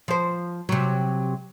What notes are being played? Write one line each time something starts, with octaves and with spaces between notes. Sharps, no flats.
F3 C5
C3 F#3